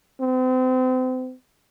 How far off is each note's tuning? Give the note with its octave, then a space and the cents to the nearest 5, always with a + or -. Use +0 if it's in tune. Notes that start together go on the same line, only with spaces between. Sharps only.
C4 -35